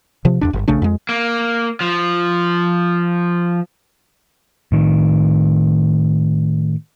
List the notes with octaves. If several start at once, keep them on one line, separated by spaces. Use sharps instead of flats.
C3 F3
E2 A#2 D4
G1
A#1 C#3 A3 D4
F2 G#3
A#3
F3
A2 D#3